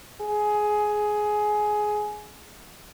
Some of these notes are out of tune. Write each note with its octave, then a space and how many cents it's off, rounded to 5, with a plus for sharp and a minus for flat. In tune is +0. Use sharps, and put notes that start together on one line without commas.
G#4 +15